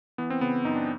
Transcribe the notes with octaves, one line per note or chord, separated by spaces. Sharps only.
E3 B3
C4
C#3 B3
F#2 D#4
D4